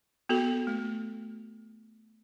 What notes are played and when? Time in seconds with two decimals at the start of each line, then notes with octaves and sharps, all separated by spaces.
0.29 B3 F#4 A4
0.67 A3